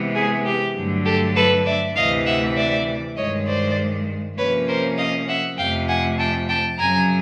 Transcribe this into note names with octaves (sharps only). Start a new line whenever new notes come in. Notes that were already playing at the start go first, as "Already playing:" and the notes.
Already playing: C3 E3 G#3 B3
G#4
G4
G2 D3 F#3 A3
G4 A4
A4 B4
D5 E5
D2 C3 E3 D#5 F5
E5 F#5
D5 E5
G2 D#3 G#3 C#5 D#5
C5 D5
C3 F3 A#3 C#4 B4 C#5
A#4 C5
D#5 F5
E5 F#5
F2 C3 F3 A3 F5 G5
F#5 G#5
G5 A5
G5 A5
F#2 C#3 F#3 G#5 A#5